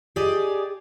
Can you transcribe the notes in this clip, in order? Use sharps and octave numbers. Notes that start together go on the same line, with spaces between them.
G4 G#4 D5 D#5